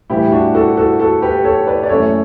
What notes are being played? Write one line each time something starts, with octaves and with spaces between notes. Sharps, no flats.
A2 E3 G3 E4 G4
D4 F#4
F#4 A4
F#4 A4
F#4 A4
G4 B4
A4 C#5
B4 D5
D5
F#2 E3 A3 A4 C#5